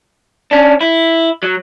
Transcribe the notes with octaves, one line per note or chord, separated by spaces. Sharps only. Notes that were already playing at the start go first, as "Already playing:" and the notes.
C#4 D4
E4
F#3